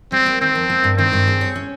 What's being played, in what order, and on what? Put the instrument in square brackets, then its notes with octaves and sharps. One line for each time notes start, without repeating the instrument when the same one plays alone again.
[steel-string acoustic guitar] G3 [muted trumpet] C4
[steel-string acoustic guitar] A#3
[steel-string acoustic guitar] D#3 [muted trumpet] C4
[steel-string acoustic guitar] F2
A#3
G2
[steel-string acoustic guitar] D#3 [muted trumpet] C4
[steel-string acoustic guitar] G2
G#4
C#5
C#4